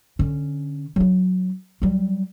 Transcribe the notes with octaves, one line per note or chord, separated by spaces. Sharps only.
D3 C#4
F#3 D4
F#3 G3